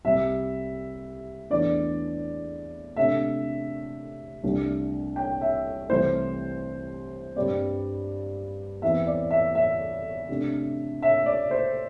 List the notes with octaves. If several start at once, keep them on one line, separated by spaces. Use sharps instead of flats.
C2 C3 G3 E5
E2 E3 A3 D4 D5
C3 A3 D4 E5
C2 C3 A3 D4
G5
E5
C2 C3 E3 A3 C5
G2 G3 C4 D5
E2 E3 C4 E5
D5
E5
E5
C3 A3 D4
E5
D5
C5